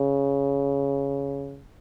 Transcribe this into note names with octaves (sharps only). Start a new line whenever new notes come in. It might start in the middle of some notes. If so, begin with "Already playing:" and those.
Already playing: C#3